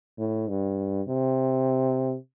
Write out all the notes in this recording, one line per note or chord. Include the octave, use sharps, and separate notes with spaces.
A2
G2
C3